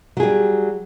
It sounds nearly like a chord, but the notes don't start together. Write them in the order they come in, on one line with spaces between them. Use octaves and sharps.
F#3 G#4 G3